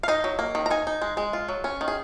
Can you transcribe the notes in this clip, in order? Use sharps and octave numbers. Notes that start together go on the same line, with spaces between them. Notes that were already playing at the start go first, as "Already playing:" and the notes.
F5
D#4 D#5
F#3
A#3
D#3
A#5
D#4 G#5
D#4
G#3
G#3
F4
F#3
C#4
D#3
G#4